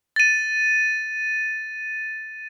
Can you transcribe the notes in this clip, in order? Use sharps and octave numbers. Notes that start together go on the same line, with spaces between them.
A6 D#7